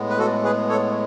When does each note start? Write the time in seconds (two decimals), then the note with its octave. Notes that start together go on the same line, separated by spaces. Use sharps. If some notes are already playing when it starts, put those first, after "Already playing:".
Already playing: A2 G#3 B3
0.09 B4
0.19 F#4 A4
0.44 G#4 B4
0.69 A4 C#5